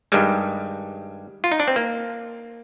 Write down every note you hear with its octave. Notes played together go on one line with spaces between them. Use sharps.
G2 D#3 G3 G#3
F4
D#4
D4
C4
A#3